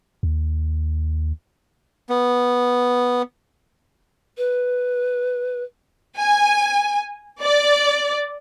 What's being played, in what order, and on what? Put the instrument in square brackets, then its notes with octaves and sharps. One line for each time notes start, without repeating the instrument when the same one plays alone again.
[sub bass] D#2
[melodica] B3
[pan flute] B4
[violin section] G#5
D5